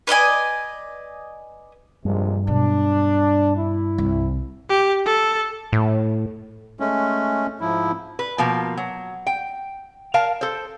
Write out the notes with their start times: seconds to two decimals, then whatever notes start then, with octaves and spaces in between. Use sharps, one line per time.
0.07 B4 D5 D#5 G#5
2.05 A#1 G2 C3 G#3
2.47 B2 F#3 D4
3.57 E4
3.98 C2
4.69 G4
5.05 A4
5.72 A2
6.80 G#3 A3 C#4
7.61 G#2 F3 E4
8.19 B4
8.38 B2 F3 A#3
8.77 F#3
9.27 G5
10.14 A#4 F5 A5
10.41 A4 C5